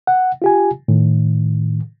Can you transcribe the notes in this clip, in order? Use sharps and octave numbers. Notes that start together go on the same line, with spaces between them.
F#5
F4 G4 G#5
A2 D#3